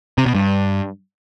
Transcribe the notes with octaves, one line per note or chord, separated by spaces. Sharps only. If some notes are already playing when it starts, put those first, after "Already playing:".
C3
B2
G2